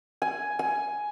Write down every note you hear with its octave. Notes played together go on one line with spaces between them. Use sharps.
G#5
G#5